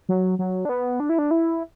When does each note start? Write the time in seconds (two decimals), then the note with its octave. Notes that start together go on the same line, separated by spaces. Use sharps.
0.09 F#3
0.39 F#3
0.65 D4
0.69 B3
1.00 D4
1.09 E4
1.19 D4
1.31 E4